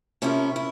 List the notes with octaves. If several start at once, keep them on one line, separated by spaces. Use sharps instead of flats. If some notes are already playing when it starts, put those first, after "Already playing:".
C3 F3 A#3 C#4 E4
E4